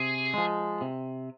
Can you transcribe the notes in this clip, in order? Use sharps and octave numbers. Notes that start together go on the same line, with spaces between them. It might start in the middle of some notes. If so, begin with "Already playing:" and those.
Already playing: C3 G#4
F3 G#3
C3